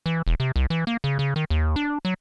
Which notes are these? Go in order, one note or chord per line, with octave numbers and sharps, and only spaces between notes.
E3
E1
C3
C2
E3
A#3
C#3
C#3
D#3
D#2
D4
F#3